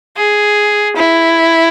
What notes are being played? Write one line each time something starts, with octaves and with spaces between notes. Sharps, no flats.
G#4
E4